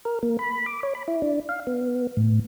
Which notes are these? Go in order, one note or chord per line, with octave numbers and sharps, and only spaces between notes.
A#4
A#3
B5
D6
C#5
B5
E4
D4
F5
B3
A2